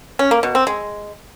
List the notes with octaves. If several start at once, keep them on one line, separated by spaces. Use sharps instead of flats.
C#4
A#3
B2
C4
G#3